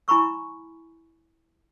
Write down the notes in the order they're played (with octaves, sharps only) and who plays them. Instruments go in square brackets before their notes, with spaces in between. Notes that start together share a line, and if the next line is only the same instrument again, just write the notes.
[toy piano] E4 G#5 A#5 B5 C#6 E6